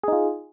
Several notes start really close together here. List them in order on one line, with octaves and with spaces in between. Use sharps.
G#4 D#4 F4